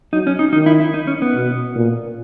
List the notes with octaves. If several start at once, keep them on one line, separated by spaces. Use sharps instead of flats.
F#3 D#4
C#4
D#4
D#3 D#4
E4
E4
D#4
C#4
B3
B2
A#2